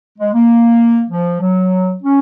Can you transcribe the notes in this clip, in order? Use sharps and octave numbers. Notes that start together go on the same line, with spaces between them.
G#3
A#3
F3
F#3
C#4